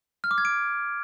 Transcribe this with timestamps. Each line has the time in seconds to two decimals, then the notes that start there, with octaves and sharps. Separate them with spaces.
0.24 F6
0.31 D6
0.38 G#6
0.45 D7